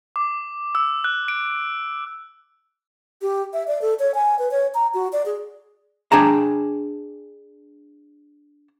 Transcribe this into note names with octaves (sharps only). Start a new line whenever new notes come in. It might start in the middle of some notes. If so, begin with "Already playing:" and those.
D6
E6
F#6
D7
G4
E5
D5
A4
C#5
G#5
B4
C#5
A#5
F#4
D5
G#4
D4 G#4 G5 A5 A#5